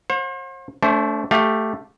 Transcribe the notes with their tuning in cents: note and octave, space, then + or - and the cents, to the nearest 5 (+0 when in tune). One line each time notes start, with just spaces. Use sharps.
C5 +40 F#5 -40
A3 +0 D4 -40 C5 +10
A3 +0 G4 +0 F5 +30